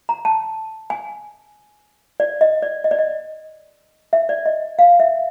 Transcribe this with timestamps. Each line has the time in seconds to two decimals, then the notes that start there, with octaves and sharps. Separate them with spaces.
0.09 A#5
0.25 A5
0.90 G#5
2.20 D5
2.41 D#5
2.62 D5
2.84 D#5
2.91 D5
2.99 D#5
4.13 E5
4.29 D5
4.46 D#5
4.79 F5
5.00 E5